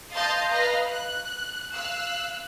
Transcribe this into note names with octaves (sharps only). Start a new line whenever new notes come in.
D#5 F5 A5 C6 G6 A6
B4 D#5 F5 A#5
F#6
F5 E6 F#6